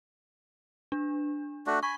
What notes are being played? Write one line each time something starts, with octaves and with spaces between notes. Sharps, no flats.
D4
A3 D4 F#4
G#5 B5 C#6